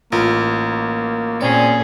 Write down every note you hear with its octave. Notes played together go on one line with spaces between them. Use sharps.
A1 A#3 F4
A#2 C4 C#4 G#4 D5